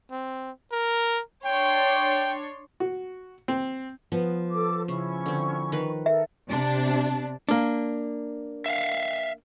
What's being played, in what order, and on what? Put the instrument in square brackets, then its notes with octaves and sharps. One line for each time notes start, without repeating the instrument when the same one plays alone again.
[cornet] C4
A#4
[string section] D4 C#5 C6 [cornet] G5
[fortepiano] F#4
C4
[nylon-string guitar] F3 [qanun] B3
[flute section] A4 D6
[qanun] C#3 [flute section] C#4 E4 C#6
[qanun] D3 C4
D#3 B4
[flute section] A4 A#4 [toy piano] E5
[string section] C3 D4
[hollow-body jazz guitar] A#3 D4
[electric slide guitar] E5 F5